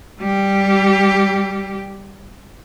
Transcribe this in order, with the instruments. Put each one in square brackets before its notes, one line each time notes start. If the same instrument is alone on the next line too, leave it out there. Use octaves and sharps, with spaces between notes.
[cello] G3 G4